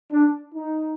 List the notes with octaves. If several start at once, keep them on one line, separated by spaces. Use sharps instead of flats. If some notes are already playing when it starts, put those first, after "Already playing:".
D4
D#4